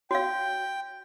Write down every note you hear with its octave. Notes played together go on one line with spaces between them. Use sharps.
F#4 F5 G5